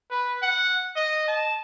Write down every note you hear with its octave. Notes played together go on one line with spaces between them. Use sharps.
B4
F#5
D#5
A5